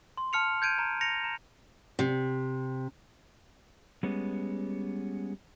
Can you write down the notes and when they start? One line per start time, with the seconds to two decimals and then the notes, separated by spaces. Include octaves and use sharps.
0.17 C6
0.33 A5 F6 C#7 F7
0.62 G6 G#6 D7 D#7
0.79 A#5
1.01 A#6 C#7 F7
1.24 A#5
1.99 C3
4.03 G3 G#3 B3 C#4